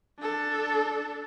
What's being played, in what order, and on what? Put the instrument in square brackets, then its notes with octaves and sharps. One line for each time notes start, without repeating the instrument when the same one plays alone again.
[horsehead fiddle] D4 A4